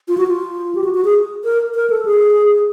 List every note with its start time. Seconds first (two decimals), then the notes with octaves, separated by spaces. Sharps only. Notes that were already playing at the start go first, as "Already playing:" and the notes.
0.08 F4
0.18 F#4
0.27 F4
0.75 G4
0.84 F#4
0.94 F#4
1.05 G#4
1.45 A#4
1.75 A#4
1.90 A4
2.05 G#4